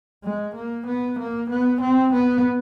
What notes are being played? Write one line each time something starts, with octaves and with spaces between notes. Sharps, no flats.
G#3
A#3
B3
A#3
B3
C4
B3